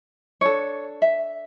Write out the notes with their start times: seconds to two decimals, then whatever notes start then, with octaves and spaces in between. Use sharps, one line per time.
0.41 D4 A4 C#5
1.02 E5